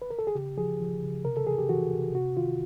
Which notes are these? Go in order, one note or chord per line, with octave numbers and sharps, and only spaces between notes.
B4
A#4
A4
G#4
C#3 G4
F3 G#4
F3
C#3
C3 A#4
A4
E3 G#4
G4
E3 F#4
C3
C3 F#4
D#3 F4